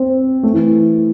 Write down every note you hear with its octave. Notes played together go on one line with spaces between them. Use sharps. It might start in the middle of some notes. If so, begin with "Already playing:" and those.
Already playing: C4
A3
E3